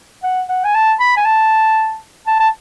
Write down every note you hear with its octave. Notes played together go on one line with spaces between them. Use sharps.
F#5
F#5
G#5
A5
B5
G#5
A5
A5
A5